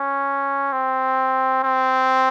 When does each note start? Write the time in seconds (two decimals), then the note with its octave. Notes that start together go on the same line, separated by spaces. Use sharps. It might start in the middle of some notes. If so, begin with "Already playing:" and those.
Already playing: C#4
0.73 C4
1.63 C4